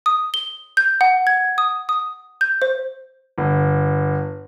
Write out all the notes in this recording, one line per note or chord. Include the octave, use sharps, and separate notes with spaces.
D#6
G7
G6
F#5
G#6
D#6
D#6
G6
C5
G1